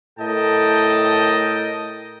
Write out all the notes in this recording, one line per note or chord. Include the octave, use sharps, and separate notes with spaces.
A2 A4 A#4 D#5 G5 A5